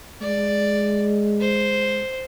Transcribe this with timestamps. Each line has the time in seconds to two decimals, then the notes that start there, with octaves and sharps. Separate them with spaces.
0.22 G#3 D5
1.41 C5